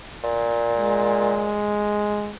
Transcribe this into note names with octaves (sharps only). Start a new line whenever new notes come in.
A#2
G#3